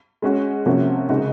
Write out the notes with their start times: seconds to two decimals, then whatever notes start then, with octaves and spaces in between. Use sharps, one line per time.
0.22 G#3 C#4 F#4
0.66 C3 F3 A#3 C#4 F#4
1.09 C#3 G#3 D#4 F#4